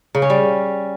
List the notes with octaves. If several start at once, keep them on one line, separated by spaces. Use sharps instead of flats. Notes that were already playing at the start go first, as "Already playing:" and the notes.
C#3
C#4
G3